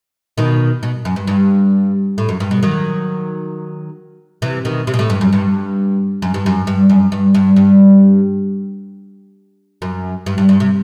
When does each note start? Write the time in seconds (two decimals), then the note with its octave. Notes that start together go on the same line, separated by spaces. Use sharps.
0.38 B2 D#3
0.83 B2
1.05 F#2
1.16 G2
1.27 G2
2.18 A2
2.29 F#2
2.40 G2
2.51 B2
2.63 D#3 F#3
4.42 C3 E3
4.65 B2 D#3
4.87 C3
4.94 B2
4.99 A2
5.10 G2
5.21 F#2
5.33 G2
6.22 F#2
6.34 G2
6.46 F#2
6.67 G2
6.89 F#2
7.12 G2
7.34 G2
7.56 G2
9.82 F#2
10.26 G2
10.38 G2
10.49 G2
10.60 C3